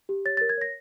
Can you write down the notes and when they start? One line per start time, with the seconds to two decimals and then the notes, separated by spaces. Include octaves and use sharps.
0.09 G4
0.25 C#5 A6
0.37 A#4 A6
0.49 G#6
0.58 C#5 A#6